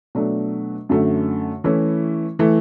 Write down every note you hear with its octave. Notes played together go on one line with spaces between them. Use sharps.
B2 F#3 A3 D4
F#2 D3 A3
E3 A3 C#4 E4
E3 A3 E4